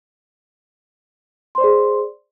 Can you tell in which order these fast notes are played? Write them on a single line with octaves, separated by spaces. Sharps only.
C6 C5 D5 G#4